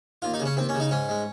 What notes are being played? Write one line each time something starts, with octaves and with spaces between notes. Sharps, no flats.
D#2 F4
D#4
C#3
C#4
D#2 C4
C#4
C#3
D#4
G#2 C#4
G#3